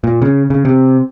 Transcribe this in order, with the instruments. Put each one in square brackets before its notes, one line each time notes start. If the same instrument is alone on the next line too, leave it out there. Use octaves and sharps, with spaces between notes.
[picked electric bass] A#2
C#3
C#3
C3